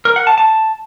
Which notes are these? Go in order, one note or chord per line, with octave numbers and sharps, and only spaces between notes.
A#4
F#5
A5
A5